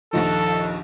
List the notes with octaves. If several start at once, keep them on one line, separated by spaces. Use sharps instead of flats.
A#1 D#2 D#3 F3 F4 A4 D#5